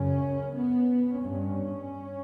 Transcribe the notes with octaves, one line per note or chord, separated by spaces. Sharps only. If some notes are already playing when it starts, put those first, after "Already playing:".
Already playing: F#2 C#3 C#4
B3
G2 C#4